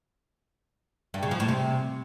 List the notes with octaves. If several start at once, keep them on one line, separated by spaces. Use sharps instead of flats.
G2
C#3
F3
A2
C3